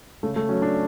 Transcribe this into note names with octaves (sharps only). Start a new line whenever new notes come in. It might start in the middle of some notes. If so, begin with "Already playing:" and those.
C#3 A3
A3
F#3 C#4
D4